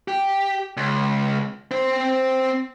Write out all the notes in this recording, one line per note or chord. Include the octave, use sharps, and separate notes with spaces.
G4
C#2
C4 C5